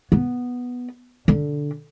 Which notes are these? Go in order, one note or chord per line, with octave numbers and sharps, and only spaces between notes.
B3
D3